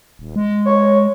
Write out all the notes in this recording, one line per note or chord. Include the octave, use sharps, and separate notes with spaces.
D#1
G#3
C#5